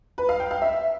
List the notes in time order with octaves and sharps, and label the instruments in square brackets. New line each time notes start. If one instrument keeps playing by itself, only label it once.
[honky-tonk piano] B4
F5
G5
F5
E5